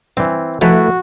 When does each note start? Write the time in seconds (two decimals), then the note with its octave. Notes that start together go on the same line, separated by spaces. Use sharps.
0.17 G2 E3 C4
0.61 F3 A3 D#4 E4 F#4 A4 B4 G#5